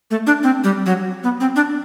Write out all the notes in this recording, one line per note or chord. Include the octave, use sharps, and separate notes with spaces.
A3
D4
C4
G3
F#3
B3
C4
D4